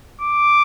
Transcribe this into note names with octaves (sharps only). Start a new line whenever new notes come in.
D6